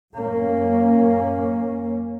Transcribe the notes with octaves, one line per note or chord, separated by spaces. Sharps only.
F#2 A#3 C#4